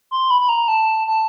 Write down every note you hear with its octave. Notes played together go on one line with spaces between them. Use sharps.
C6
B5
B5
A#5
A5
A5